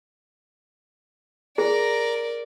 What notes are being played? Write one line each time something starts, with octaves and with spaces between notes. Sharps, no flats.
G#4 A#4 D5 A#5